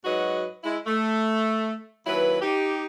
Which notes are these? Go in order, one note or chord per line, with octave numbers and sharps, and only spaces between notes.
G#2 F#3 F#4 B4 D#5
G#3 E4
A3
D#2 F#3 E4 B4
D#4 G4